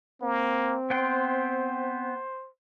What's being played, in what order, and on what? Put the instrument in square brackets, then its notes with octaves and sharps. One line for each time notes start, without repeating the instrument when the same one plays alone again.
[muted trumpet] A#3 [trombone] C4
[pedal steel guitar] B3 G5 C6 [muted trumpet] C5